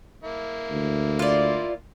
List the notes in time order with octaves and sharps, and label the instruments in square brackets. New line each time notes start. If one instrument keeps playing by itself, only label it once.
[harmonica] A#3 E4
[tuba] D2
[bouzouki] F4 D5